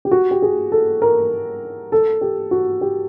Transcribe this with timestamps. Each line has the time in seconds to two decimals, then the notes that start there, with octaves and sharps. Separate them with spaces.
0.05 G4
0.11 F#4
0.31 G4
0.42 G#4
0.72 A4
1.02 A#4
1.92 A4
2.21 G4
2.51 F#4
2.81 G4